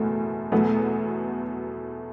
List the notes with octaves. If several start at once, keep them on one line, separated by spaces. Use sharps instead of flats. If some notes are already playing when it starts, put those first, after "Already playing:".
Already playing: F#1 E2 B2 A3
E2 B2 F#3 A3 B3